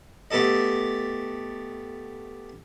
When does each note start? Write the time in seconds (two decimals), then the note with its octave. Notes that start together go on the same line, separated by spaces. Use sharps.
0.31 A3 B3 G4 A4 D#5